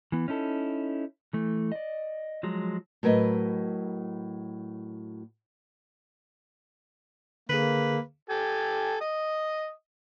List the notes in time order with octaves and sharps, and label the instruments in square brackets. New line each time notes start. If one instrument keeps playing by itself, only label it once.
[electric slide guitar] E3 B3
C#4 D#4 E4 A4
E3 A3
D5 D#5
F3 F#3 G#3
[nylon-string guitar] A2 F#3 A#4 B4 D#5
[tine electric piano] D3 G#4 [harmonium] A#3 [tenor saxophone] B4
[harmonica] G4 A4 G#5
D#5 D#6